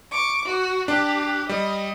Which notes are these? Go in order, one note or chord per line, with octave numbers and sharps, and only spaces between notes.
C#6 D6
F#4
D4 G4
G3 D#5